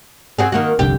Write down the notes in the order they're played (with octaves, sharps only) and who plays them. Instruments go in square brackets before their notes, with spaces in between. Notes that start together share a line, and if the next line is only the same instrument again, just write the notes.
[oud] C4 F#4 G#4
D#3 A#3 F#4
[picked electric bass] F1 C2 D3 [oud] G4